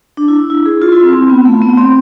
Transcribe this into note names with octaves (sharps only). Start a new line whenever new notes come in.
D4
E4
E4
E4
G#4
F4
E4
C4
C4
B3
A3
B3
C4